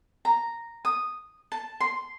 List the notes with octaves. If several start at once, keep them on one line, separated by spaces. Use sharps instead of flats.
A#5
D#6
A5
C6